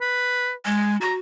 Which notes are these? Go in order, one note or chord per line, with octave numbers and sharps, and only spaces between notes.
B4
G#3 G#5
F#4 A#5